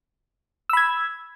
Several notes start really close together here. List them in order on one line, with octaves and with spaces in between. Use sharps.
E6 B5 G#6